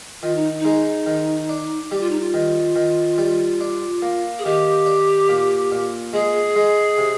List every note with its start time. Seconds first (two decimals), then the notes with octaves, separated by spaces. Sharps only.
0.22 D#3 F4
0.35 D#4
0.59 D#4
0.65 G#3
1.06 D#3
1.49 D4
1.91 G3 G4
2.00 F4
2.10 D#4
2.19 F4
2.34 D#3
2.76 D#3
3.18 G3
3.61 D4
4.02 A#3
4.39 G#4
4.45 D#3 G4
4.86 D4
5.29 A#2
5.72 A#2
6.13 G#3 G#4
6.56 G#3
6.98 C3